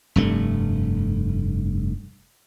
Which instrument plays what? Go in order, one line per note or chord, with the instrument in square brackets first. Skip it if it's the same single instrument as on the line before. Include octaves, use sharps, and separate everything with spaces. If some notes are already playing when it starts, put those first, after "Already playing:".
[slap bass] F1 G2 A3